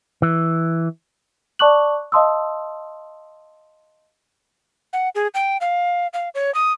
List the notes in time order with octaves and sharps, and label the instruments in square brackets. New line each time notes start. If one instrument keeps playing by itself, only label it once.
[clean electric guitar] E3
[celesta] D5 A5 C#6 D6 F#6 F#7
D#5 F5 A5 C6 D#6 E6
[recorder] F#5
G#4
G5
F5
F5
C#5
D#6